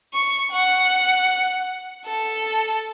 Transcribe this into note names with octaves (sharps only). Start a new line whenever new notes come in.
C#6
F#5
A4